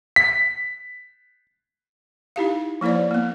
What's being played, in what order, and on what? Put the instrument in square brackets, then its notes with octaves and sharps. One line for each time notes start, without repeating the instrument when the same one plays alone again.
[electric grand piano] B6
[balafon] D#4 E4 G4 F5
F3 A#3 E4 C5 D5
A#3 B3